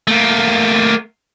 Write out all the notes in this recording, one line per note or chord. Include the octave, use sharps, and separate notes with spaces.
A3 A#3